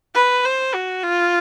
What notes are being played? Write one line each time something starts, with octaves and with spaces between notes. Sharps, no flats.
B4
C5
F#4
F4